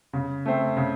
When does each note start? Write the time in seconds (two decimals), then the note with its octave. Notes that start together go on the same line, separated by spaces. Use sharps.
0.13 C#3
0.46 A3 C4
0.77 C#3